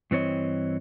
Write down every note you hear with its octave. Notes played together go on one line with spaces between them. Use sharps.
G2 E3 C4 C#5 D#5